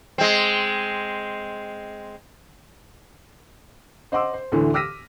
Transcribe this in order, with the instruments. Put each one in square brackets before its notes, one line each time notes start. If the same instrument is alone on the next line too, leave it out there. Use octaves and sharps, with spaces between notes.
[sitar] G#3 C4
[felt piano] C5 D#5 F#5 C6 D6 E6
C5
D2 A2 D3 E3
D6 E6 F6 A#6 B6 D#7